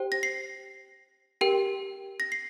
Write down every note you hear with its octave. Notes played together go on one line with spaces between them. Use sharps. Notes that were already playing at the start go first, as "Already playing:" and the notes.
Already playing: G4 C5 G5
A#6
C7
G4 A#4 G5
A#6
C7